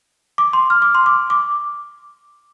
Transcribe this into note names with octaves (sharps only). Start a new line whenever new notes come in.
D6
C6
F6
D6
C6
D6
D6